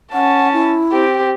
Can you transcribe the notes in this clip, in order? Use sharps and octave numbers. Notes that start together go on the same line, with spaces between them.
C#4 F#5 A5
E4
C4 G4